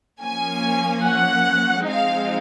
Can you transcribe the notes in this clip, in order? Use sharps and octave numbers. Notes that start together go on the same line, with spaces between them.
F3 A#3 C#4 G#5
F#5
F3 G#3 C4 D#4 F5